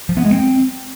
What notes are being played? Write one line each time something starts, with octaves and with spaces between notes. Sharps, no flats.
F3
B3
G#3
C4